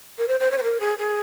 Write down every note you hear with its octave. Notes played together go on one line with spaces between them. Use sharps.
A#4
C5
C5
C#5
C5
A#4
G#4
G#4